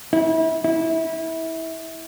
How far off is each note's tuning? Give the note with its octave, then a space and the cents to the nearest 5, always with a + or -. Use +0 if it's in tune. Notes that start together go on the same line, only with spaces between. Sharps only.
E4 -30
E4 -20